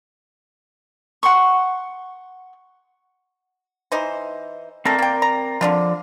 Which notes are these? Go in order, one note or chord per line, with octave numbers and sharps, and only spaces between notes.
F#5 C6 C#6
E3 D#4 C5
A3 C4 A4 A#4 D5
A#3 G5
A#5
D3 F3 D4 F4